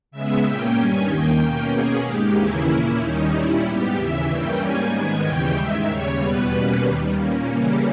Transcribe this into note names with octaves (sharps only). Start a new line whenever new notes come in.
C#3 G#3 B3 E5
A#2 A#3 C#4 G5
G2 D#3 G3 C#4 G#5
D#2 D#3 A#3 G5
B2 A#3 C#4 G5
B2 A#3 C#4 G#4
G#2 D#3 G#3 G4
D#2 C#3 E3 A#3 C#4 E4
A#2 A#3 C#4 E4
D#2 D#3 G3 C#4 D#4
A#2 G3 C#4 E4
G#2 G3 B3 G4
D#2 C#3 E3 E5
G2 E3 G3 A#3 C#4 G5
G#2 G3 A#3 C#4 G#5
G#2 D#3 G#3 B3 G#5
D#2 C#3 E3 G3 C#4 G5
G#2 D#3 G#3 E5
D#2 C#3 G3 C#5
E2 B2 G3 B3 B4
B2 G3 A#3 C#4 B4
D#2 D#3 G3
A#2 A#3 C#4
C#3 E3 G3 A#3 C#4